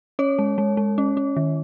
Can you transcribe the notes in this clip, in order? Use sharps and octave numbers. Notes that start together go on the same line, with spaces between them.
C#4 C#5
G#3
G#3
G#3
C#4
C#4
D#3